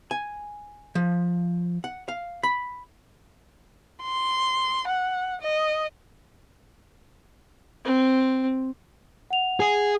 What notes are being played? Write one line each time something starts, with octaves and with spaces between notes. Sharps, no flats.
G#5
F3
F#5
F5
B5
C6
F#5
D#5
C4
F#5 F7
G#4